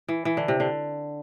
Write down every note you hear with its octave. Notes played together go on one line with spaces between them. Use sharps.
E3
E3
D3
C3
D3